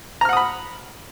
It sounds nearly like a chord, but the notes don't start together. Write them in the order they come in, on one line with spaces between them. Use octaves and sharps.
A#5 F6 F#5 D#6 B5